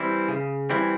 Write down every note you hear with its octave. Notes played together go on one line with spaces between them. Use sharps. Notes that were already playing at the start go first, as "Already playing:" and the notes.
Already playing: E3 G3 C4 E4
C#3
E3 G3 C4 E4